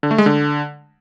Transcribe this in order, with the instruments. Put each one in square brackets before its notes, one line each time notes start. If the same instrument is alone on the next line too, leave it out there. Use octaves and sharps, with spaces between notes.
[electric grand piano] D3
A3
G#3
D3